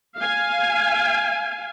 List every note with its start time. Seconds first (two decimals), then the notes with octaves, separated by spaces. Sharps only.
0.18 F5 G#5